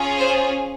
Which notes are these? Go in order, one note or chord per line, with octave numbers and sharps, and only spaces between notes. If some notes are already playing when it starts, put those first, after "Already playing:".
Already playing: C#4 F4 G#4
C5